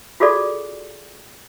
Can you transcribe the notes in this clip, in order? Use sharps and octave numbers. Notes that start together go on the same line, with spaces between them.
F4 F#4 G#4 A4 D5